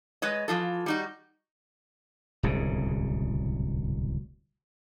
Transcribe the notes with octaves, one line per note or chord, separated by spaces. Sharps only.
G#3 B4 C#5 D#5
E3 F3 F4 A4
G3 D#4 F#4
D1 C2 G#2 C#3